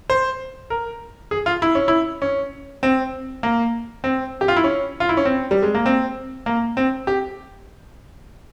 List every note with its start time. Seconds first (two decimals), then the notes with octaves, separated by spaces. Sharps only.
0.10 C5
0.70 A#4
1.31 G#4
1.46 F4
1.62 E4
1.75 C#4
1.88 E4
2.22 C#4
2.83 C4
3.43 A#3
4.04 C4
4.41 G4
4.48 F4
4.57 E4
4.64 C#4
5.00 F4
5.09 E4
5.17 C#4
5.25 C4
5.51 G3
5.62 G#3
5.75 A#3
5.86 C4
6.46 A#3
6.77 C4
7.07 G4